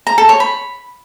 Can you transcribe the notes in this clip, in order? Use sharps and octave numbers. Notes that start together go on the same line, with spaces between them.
A#5
A4
C#5
B5